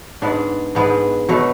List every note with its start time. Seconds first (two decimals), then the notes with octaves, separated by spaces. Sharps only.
0.22 G#2 G#3 B3 D4
0.75 G#2 G#3 B3 D4
1.29 B2 F#3 A3